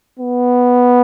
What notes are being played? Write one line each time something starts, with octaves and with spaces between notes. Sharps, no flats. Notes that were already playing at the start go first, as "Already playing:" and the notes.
B3